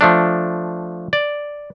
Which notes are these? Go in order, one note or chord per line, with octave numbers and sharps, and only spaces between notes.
F3 A3 D4
D5